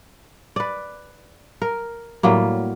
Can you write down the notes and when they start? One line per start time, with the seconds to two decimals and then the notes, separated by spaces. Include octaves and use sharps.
0.56 B4 D5
1.62 A#4
2.23 A2 F#3 G3 A#3